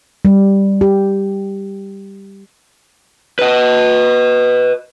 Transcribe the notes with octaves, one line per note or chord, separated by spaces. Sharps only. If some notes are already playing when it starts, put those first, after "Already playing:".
G3
G4
B4 D#5